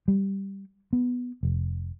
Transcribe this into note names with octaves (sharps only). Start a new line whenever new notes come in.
G3
B3
F1